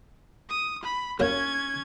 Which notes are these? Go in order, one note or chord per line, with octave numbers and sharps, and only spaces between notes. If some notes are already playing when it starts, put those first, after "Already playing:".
D#6
B5
F#2 F#3 A#3 C#4 G#6